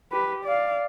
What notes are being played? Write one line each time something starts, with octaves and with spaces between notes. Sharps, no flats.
G4 B4
D5 F5